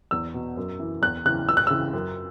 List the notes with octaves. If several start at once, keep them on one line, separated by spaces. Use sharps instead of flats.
E2 E6
B2
F#2
E3
E2 F#6
C#3 E3 F#6
C#2 E6
F#6
C#3 E3 E6
F#2